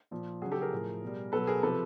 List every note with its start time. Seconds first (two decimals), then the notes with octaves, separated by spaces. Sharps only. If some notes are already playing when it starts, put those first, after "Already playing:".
0.11 A#2 F3
0.42 C#3 F#3 F#4 G#4
0.52 G4 A4
0.61 G#4 A#4
0.72 A2 F3
1.02 B2 G3
1.32 B2 F#3 A4 B4
1.47 G#4 A#4
1.63 C3 F3 A4 B4